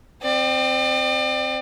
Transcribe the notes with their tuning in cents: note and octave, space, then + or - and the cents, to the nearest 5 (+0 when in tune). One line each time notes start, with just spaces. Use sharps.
C4 +0 D5 +35